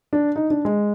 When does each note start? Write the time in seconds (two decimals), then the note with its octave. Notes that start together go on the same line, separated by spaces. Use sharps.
0.13 D4
0.36 D#4
0.50 D4
0.65 G#3